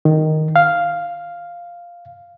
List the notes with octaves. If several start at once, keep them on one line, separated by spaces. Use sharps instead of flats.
D#3
F5